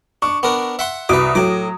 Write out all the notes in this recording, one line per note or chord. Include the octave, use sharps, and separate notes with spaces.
D4 C#6
B3 D4 A#4
E5 F#5 C6
C2 F#4 B4 D6 D#6
A2 F#3 D6